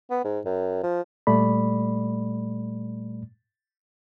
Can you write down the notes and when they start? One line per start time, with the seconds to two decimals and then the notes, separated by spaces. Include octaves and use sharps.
0.11 B3
0.24 G#2
0.45 F#2
0.83 F3
1.27 A#2 G3 A3 D5 B5